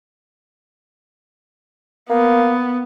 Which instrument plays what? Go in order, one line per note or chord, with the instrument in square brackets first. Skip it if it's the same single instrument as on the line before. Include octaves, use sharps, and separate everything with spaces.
[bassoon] A#3 [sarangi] B3